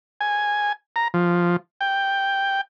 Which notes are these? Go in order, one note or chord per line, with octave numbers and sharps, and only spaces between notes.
G#5
A#5
F3
G5